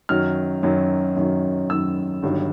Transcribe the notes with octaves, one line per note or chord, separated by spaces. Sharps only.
F#2 D#3 F#3 F6
F#2 D#3 F#3
F#2 D#3 F#3
F#2 D#3 F#3 E6
G1 G2 D#3 F#3